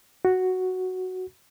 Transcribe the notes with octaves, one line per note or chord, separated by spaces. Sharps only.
F#4